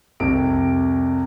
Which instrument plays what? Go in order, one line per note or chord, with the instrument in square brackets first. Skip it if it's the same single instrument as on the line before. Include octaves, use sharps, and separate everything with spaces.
[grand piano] C2 F2 C3 D7